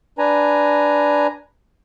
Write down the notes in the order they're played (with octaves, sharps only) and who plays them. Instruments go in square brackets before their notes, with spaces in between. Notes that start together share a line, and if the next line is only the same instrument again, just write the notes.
[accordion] D4 B4 G#5 A#5